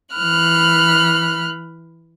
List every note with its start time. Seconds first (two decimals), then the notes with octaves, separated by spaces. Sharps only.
0.15 E3 B5 F6 F#6